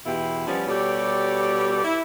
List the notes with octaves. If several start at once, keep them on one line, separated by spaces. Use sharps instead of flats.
E2 B2 E3 E4 F4 G4
F3 G3 B3 C#4
B2 G3 G4 A4 C#5 D5
E4